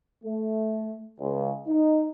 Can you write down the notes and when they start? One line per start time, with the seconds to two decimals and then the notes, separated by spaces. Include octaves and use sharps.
0.24 A3
1.20 C#2
1.67 D#4